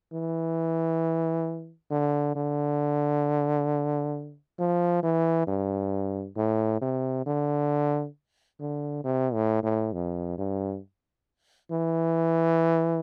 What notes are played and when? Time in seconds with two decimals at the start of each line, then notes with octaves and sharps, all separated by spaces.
0.12 E3
1.91 D3
2.35 D3
4.58 F3
5.03 E3
5.47 G2
6.36 A2
6.81 C3
7.26 D3
8.60 D3
9.04 C3
9.33 A2
9.63 A2
9.93 F2
10.38 G2
11.71 E3